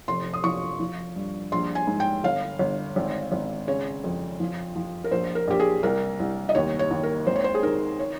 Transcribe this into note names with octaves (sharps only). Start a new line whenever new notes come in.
F1 C6
D#6
F3 C#6
F3
G2
A#1 C6
G#5
G#2
G5
G1 F5
G1
G#1
G#1
C#3 C#5
F2
F3
F3
A#4
A#1 C5
A#4
A#1 G4
G#4
C2 A#4
C2
D#5
D#2 C#5
C#5
D#2
A#4
G#1 C5
C#5
C5
G#4
D#3 A#4
C#5